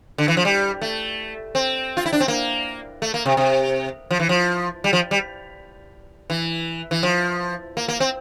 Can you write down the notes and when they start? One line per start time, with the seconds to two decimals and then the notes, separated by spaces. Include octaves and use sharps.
0.18 D3
0.28 E3
0.37 F3
0.45 G3
0.82 A3
1.55 C4
1.97 F4
2.06 E4
2.13 D4
2.20 C4
2.28 A#3
3.02 A3
3.14 A#3
3.26 C3
3.37 C3
4.11 F3
4.20 E3
4.29 F3
4.84 G3
4.93 F3
5.11 G3
6.30 E3
6.91 E3
7.03 F3
7.77 A#3
7.88 A#3
8.00 C4